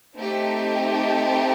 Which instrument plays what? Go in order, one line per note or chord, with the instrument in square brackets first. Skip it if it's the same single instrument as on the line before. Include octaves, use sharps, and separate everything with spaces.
[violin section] A3 C4 D#4 G4